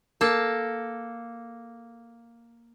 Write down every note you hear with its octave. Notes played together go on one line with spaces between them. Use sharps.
A#3 A4